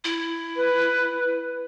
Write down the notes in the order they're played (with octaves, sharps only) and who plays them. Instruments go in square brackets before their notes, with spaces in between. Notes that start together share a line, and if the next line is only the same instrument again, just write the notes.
[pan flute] E4
[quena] B4